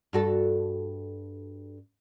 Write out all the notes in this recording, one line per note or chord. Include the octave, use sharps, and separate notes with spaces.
G2 F#4 A4